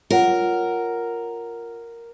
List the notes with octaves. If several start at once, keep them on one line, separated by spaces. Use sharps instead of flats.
F4 A#4 C#5 F#5